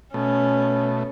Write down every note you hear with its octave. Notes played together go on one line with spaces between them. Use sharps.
B2 A3 C#4